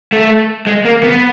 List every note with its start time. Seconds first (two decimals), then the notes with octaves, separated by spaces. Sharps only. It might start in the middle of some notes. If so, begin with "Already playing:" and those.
0.12 A3
0.67 G#3
0.85 A#3
1.03 B3